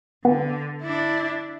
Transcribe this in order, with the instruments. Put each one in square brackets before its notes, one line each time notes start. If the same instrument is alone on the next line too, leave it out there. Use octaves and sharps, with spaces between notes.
[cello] D3 [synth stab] B3
[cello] D4 E4